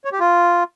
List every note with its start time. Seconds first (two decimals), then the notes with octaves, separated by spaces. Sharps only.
0.05 C#5
0.12 G4
0.20 F4